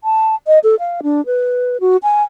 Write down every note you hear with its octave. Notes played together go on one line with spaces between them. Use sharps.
A5
D#5
A4
F5
D4
B4
F#4
G#5